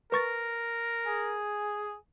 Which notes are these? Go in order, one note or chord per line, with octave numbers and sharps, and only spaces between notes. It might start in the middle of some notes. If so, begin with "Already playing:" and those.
A#4 B4 C#6 A6
G#4 G#5